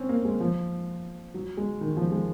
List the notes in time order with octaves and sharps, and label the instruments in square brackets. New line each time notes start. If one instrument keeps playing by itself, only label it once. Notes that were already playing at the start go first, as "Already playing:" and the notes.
Already playing: [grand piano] C4 C#4
A#3
G#3
F3
F#3
G#3
D#3
F3
G#3